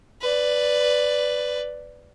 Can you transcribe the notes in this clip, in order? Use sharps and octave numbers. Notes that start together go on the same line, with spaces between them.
B4 D5